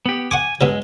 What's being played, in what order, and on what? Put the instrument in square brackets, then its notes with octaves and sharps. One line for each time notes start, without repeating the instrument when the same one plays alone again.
[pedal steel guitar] B3 G4
[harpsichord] F#5 C#6 D6 [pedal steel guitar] G#5
[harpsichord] G2 B2 F#3 [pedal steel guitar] G#3